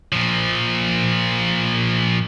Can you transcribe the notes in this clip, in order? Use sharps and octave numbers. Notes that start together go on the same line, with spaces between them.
A#2 F3